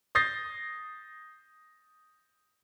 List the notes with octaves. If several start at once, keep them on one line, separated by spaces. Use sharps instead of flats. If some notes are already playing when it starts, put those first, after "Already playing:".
D#6 G6 A6 A#6 C7